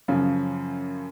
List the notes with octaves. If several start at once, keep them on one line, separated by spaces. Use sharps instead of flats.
F#2 C#3 F3